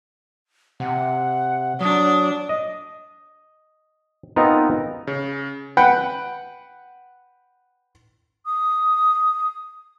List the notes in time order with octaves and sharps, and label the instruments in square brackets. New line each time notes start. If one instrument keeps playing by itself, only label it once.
[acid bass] C3 [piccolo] F#5
[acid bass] F#3 [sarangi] D4 [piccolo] D#6
[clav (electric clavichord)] D#5
B3 C4 D#4 F4 A#4
[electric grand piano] C#3
[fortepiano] B4 F#5 G5 B5
[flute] D#6